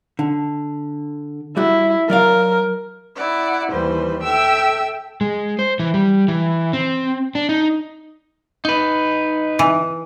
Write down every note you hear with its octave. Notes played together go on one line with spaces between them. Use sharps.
D3
G3 E4 F#4
F#3 A#4 D5 F5
E4 D5 F#5
D#2 E3 G3 B4 C5
A4 E5 G5 E6
G#3
C5
E3
G3
E3
C4
D4
D#4
D#4 B4
E3